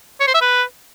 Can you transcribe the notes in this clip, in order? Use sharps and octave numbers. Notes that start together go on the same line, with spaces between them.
C#5
C5
E5
B4